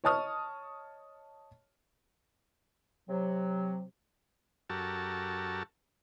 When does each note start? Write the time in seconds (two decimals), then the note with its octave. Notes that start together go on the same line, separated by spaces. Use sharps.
0.04 C#5 D#5 A5 C#6 D#6 F6
3.09 C3 F#3
4.70 F#2 F#4 G4 A4 A#4 A5